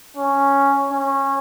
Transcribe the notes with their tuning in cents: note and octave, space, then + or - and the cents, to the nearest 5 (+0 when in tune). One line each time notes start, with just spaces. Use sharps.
C#4 +0
C#4 -20